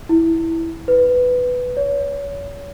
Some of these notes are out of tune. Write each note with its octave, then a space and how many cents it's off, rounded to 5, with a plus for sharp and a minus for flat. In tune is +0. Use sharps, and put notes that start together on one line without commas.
E4 -5
B4 +10
C#5 +30